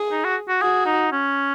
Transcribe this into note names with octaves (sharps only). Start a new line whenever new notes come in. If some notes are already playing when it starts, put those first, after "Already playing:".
Already playing: G#4
D#4
F#4
F#4
F#4 G#4
D#4
C#4